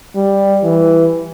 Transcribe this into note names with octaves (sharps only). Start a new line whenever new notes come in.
G3
E3